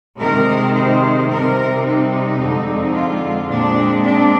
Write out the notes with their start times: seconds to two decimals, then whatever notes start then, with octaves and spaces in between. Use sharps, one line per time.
0.19 C3 D#3 G#3 C4 A#4
0.74 C5
1.29 C3 G3 C4 A#4
1.84 D#4
2.39 F2 D3 G#3 C4
2.93 F4
3.49 A#2 G#3 C4 D4
4.03 D4